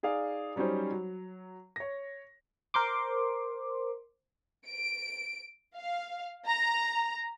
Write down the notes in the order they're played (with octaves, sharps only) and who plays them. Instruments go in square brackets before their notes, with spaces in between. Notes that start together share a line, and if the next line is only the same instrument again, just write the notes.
[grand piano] D#4 G#4 D5 F5
F#3 G3 C#4 D#4 C5
F#3
C#5 A#6
[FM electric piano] A#4 C5 C6 D6
[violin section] D7
F5
A#5